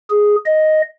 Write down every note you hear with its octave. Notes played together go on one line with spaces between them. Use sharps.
G#4
D#5